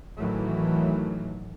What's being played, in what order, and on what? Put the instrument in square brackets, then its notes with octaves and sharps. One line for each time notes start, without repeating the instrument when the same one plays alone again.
[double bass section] A1 D#3 E3 F#3 A3